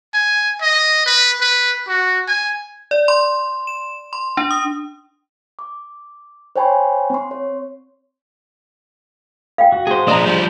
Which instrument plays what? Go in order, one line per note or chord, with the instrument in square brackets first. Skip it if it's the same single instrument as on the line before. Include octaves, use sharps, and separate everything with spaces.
[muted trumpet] G#5
D#5
B4
B4
F#4
G#5
[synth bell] D5
C6
E7
C6
D4
D#6
[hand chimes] D6
C5 C#5 G5 G#5 B5 C6
C4 C6
C#5
[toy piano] F5 G5
[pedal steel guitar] F#4
[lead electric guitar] G#4 C5
[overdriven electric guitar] F3 D4 [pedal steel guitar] D#5 A#5
[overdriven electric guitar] F3 G3 [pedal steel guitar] G6